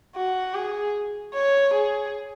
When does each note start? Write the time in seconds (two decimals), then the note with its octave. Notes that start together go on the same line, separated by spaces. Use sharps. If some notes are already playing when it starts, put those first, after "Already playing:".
0.16 F#4
0.54 G#4
1.34 C#5
1.73 G#4